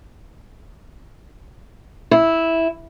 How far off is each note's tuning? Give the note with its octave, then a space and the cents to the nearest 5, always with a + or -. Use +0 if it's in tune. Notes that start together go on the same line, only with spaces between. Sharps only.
E4 -5